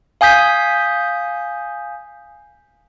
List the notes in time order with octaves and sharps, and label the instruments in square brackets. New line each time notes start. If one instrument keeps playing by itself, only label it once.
[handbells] F5 G#5 D#6 G6 B6